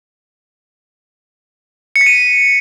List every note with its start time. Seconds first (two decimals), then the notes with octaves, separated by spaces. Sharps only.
1.96 C#7
2.01 B6
2.06 D#7